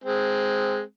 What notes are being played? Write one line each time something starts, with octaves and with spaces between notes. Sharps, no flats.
G#3 C4